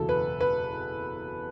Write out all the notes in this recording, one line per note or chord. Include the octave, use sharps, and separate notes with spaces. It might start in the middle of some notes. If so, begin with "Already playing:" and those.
Already playing: F#1 E2 B2 A4
B4
B4